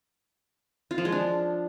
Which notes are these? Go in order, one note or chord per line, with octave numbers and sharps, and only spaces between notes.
F4
F3
G#3
D4